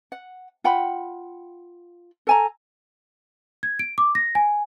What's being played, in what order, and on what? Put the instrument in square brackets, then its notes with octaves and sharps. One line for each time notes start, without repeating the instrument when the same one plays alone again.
[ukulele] F#5
F4 F#5 G5 B5
A4 G#5 A#5
[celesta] G#6
D7
D6
A#6
G#5